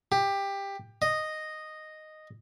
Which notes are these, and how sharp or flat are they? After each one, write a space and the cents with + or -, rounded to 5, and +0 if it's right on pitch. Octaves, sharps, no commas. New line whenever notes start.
G4 +15
D#5 -5